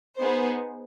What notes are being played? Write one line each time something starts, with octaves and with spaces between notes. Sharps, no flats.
B3 D#4 G#4 C5